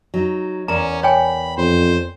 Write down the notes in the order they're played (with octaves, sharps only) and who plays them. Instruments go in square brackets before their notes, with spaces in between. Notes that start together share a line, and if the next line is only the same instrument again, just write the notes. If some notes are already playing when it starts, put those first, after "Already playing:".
[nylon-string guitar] F#3 D#4
[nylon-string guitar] E2 A#4 D5 [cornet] C#4 [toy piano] A#5
[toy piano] C#5 G5 G#5 [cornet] B5
[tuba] F2 [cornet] C5